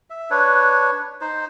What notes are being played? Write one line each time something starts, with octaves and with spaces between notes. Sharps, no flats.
E5
D4 B4 C#5
D#4 C5